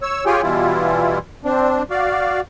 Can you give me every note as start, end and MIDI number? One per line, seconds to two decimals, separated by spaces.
0.02 0.25 73
0.02 0.25 88
0.26 0.42 65
0.26 0.42 67
0.26 0.42 68
0.26 0.42 73
0.26 0.42 79
0.26 0.42 80
0.42 1.19 47
0.42 1.19 52
0.42 1.19 55
0.42 1.19 64
0.42 1.19 65
1.45 1.83 60
1.45 1.83 62
1.90 2.41 66
1.90 2.41 74
1.90 2.41 77